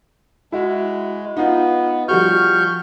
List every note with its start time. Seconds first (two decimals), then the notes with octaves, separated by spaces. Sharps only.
0.52 G#3 E4 F#4
1.37 B3 D#4 F4
2.08 F3 G3 F#4 C#6 F6 G6